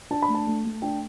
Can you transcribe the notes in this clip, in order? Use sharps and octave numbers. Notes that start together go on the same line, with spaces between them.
D4 A5
B5
A3
A5
A3
A3
D4 G5